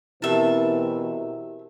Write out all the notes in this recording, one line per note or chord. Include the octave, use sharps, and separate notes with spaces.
B2 E3 C4 E4 G4 A#4 E5 A5